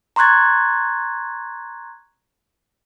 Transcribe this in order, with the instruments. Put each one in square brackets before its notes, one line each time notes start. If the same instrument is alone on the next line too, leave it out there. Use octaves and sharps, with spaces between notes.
[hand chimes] A#5 C6 C#6 F#6 G#6 A6